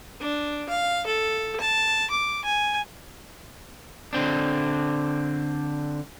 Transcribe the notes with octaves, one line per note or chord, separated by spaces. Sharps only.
D4
F5
A4
A5
D6
G#5
D3 C4 D4